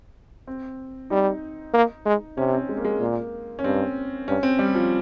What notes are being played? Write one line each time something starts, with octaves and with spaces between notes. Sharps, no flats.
C4
G3 D#4
A#3
G#3
C3 C#4
C4
G#3
A#3
G#3
A#2 A#3
C#4
G2 C4
G2 C#4
C4
G3
F3